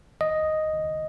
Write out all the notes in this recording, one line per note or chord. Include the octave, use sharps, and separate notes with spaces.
D#5